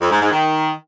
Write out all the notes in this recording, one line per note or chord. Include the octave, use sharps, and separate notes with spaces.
F2
G#2
G#2
D#3